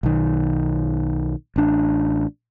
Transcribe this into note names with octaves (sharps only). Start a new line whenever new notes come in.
B1 D#3
A1 D4